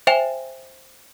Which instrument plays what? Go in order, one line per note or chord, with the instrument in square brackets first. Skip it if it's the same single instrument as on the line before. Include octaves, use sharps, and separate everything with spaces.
[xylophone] C5 E5 G5 G#5 E7 F7